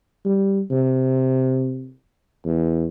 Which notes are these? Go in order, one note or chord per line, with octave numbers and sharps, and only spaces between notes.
G3
C3
E2